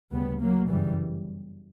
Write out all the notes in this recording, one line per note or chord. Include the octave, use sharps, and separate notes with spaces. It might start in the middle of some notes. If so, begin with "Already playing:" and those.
D2 C#3 G3 B3
F#3 A#3
G1 F#2 C#3 E3 G3